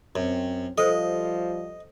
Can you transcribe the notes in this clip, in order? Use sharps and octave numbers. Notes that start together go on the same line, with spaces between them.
F#2 C4
F3 G3 A4 C5 D#5